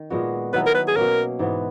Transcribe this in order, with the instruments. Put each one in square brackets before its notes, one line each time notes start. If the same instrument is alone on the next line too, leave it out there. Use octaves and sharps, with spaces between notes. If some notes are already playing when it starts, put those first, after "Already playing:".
Already playing: [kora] D#3
A#2 G#3 B3 F#4
[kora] D#3 F#3 B3 E4 [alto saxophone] B4
[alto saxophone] A#4
B4
G#4
[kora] B2 A#3 C#4 [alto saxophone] A#4
[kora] G#2 E3 B3